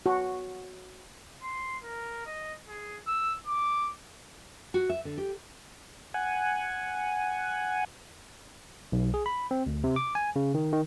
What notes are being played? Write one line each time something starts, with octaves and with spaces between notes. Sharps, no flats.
F#4
C6
A#4
D#5
G#4
E6
D6
F#4
E5
D3
G4
F#5 G#5
B1
G#4
B5
C4
D2
C3
D6
G#5
C#3
D#3
D#3